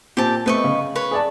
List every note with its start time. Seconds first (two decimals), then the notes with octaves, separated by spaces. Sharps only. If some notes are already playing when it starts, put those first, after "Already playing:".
0.17 A#2 C4 G4 A5
0.46 A3 B3 C4 B4 D#5 C#6
0.64 C#3
0.96 B4 C#5
1.11 G#4 D5 A5